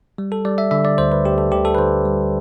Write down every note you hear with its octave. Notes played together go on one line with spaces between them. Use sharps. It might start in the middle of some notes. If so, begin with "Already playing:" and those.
G3
A4
G3 D5
E5
D3 E5
D5
D2 C5
B4
D2 G4
A4
D2 G4
A4
B4
D3 C5
G3